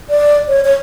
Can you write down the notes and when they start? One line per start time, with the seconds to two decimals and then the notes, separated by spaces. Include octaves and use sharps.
0.10 D5
0.49 C#5
0.64 C#5